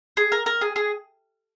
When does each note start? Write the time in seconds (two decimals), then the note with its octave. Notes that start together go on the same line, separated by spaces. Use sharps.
0.17 G#4
0.32 A#4
0.46 A#4
0.61 G#4
0.76 G#4